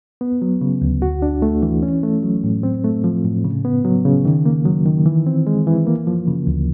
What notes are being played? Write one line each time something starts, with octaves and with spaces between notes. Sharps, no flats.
B3
F#3
C#3
D2
F#4
D4
A3
E3
C#4
A3
F#3
A2
C4
A3
F3
A2
C#3
B3
F#3
C#3
D#3
A#3
F#3
D#3
E3
C4
G#3
E3
A#3
F3
C#3
D2